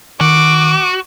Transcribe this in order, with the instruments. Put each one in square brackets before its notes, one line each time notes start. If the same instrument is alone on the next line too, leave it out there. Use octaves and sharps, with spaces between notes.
[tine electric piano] D#3 [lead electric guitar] F#4 [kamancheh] D6